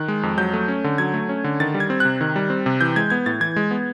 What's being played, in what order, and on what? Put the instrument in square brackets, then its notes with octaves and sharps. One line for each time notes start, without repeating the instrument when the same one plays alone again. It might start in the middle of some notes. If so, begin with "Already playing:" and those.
Already playing: [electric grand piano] D#3 F#6
G#3
F2
F#3 G6
A3
C#4
D3
F#3 G#6
A3
C#4
D3
D#3 A6
G3
G#6
C4
C3 F#6
D#3
G3
C4
C3
E3 G6
G#3 G#6
B3 G#6
A2 A6
E3 G#6
G#3
B3